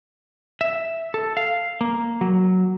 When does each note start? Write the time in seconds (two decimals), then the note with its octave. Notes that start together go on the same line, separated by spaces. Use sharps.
0.61 E5
1.14 A4
1.37 F5
1.81 A#3
2.21 F#3